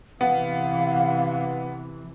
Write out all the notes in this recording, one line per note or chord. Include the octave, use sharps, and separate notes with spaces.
C3 E3 B3 F5